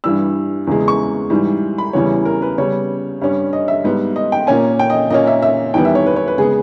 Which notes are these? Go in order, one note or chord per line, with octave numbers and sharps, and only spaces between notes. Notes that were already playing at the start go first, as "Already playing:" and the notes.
G2 E3 G3 E6
E2 C#3 G#3
C#6
G#2 E3 G3
B5
E2 C#3 E3 G3 C#5
A#4
B4
C#3 G3 B3 C#5
G2 G3 C#4
D#5
E5
G#2 G3 B3
D#5
G5
A#2 A#3 C#4 G#5
G5
D#5
A#2 A#3 C#4 D#5
E5
E5
E2 D#3 G3 B3 G5
E5
C#5
B4
C#5
B4
C#3 G#3 B3 G#4